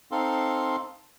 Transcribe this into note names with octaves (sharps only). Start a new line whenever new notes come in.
C4 D#4 A4 F5 C6